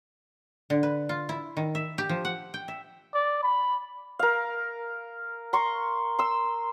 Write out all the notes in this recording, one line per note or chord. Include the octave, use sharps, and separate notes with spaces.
D3
B4
F4
E4
D#3
E5
G4
F3
F#5
G5
E5
D5
B5
A#4 F5
A#5 C6 C#6
C6 E6